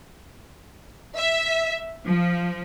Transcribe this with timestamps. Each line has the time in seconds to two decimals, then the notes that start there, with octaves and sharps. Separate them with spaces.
1.15 E5
2.03 F3